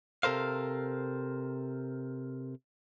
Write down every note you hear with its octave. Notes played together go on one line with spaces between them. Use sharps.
C3 A4 A#4 C5 F5